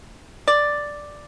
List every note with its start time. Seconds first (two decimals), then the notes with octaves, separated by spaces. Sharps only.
0.48 D5